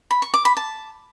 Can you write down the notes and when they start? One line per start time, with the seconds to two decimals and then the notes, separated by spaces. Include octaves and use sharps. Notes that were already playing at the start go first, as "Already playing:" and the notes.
0.11 B5
0.22 C#6
0.34 D6
0.45 B5
0.57 A5